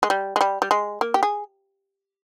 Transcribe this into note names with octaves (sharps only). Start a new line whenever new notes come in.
G#3
G3
G#3
G3
G3
G#3
A#3
G4
G#4